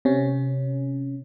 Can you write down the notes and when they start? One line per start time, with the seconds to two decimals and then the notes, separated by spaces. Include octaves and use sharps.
0.05 C3 C#4